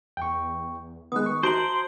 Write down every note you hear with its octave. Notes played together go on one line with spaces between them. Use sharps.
E2 G5 C#6
D#3 G#3 B3 D#6 F#6
C#6
F#4 C5 A5 A#5 D7 F#7